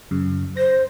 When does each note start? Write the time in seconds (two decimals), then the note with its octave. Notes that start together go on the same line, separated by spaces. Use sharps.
0.11 F#2 C#3
0.57 C5 A#6